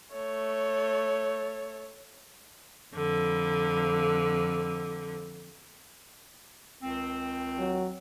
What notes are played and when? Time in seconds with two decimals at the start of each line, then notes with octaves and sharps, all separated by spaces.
0.12 A3 C#5
2.95 F2 D3
6.83 C#2 D#3 C4
7.58 F#3